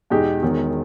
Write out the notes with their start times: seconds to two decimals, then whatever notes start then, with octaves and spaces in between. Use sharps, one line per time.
0.10 E2 B2 G#3 D#4 G4
0.42 E1 E2 D#3